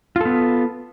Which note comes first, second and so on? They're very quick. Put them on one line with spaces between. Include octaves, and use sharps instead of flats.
F4 A4 B3